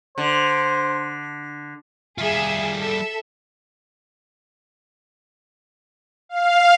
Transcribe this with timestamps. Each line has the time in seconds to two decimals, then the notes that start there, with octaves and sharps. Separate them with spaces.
0.18 D3 C5
2.18 G3 F4 G#4 E5
2.79 A4 E5
6.29 F5